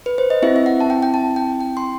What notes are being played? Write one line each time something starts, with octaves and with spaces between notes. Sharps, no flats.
B4
C5
D#5
C4 E4 G4 E5
E5
F#5
A5
G5
G5
A5
G5
G5
C6